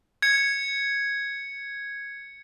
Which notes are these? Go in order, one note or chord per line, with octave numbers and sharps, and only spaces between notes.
G#6 C#7